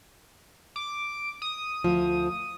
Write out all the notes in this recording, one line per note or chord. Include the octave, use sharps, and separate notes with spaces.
D6
D#6
D2 F3